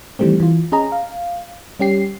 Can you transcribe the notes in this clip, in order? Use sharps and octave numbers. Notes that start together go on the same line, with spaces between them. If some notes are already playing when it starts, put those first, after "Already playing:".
D#3 E3 G3 A3 C4
E3 F4
C#4 G#4 D#5 A#5
F5
G3 C#4 G4 C7